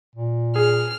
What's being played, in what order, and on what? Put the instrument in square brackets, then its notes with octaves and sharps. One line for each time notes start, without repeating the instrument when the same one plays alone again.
[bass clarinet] A#2
[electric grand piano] G#4 [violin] F6